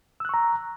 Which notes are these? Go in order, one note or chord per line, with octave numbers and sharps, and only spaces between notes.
A#5 C#6 E6 F#6